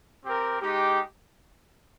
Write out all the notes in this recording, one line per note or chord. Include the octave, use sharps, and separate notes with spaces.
C4 G4 A#4
G#3 D#4 G4